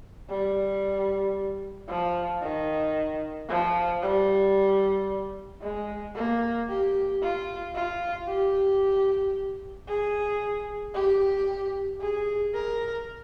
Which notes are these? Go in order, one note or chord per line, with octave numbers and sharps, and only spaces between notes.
G3
F3
D#3
F3
G3
G#3
A#3
G4
F4
F4
G4
G#4
G4
G#4
A#4